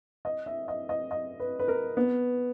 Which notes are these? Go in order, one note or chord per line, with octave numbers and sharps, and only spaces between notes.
D#5
E5
D#5
D#5
D#5
B4
B4
A#4
B3